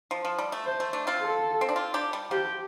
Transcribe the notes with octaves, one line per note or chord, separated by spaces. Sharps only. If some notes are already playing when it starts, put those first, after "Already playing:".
F3
F3
G3
A3
C5
A3
A3 D4
C4 F4
A4
C4
D4
C4 F4
D4 G4
G3
F3 G4